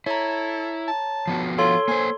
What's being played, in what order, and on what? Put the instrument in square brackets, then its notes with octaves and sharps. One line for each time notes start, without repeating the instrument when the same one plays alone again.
[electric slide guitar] E4 [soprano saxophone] A4 [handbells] C#5 A#5
[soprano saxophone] A5
[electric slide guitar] F3 B3 F#4
[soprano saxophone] F4 [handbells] A4 C#5 C6
[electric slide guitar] A#3 C5 [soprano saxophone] G#5